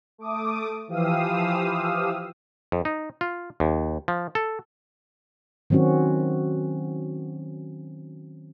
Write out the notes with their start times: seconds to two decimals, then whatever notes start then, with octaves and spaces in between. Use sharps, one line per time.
0.18 A3 D6 D#6
0.88 E3 F3 G4 F5 D#6 E6
2.72 F2
2.85 D#4
3.21 F4
3.60 D#2
4.08 F3
4.35 A4
5.70 D#3 F#3 C4 C#4 F#4